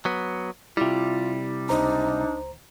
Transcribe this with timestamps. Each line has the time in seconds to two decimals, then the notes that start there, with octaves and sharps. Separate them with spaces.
0.05 F#3 B3
0.77 C3 G3 E4 F4
1.69 C#2 D4 D#4 C5 A#5